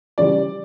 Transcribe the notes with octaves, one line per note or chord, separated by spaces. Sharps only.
C#3 E3 G3 D5